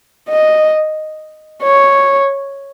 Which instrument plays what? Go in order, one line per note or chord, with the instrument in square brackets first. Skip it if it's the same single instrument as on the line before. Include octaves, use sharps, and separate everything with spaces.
[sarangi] D#5
C#5